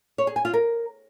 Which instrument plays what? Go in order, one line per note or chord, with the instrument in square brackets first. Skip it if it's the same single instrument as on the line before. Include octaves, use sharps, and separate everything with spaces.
[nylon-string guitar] C#5
G#4
G#5
F4
A#4